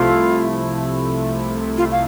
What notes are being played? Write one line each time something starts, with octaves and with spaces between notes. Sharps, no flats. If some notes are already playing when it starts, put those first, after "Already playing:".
Already playing: C2 C3 F3 A3 E4 F4
F4
F5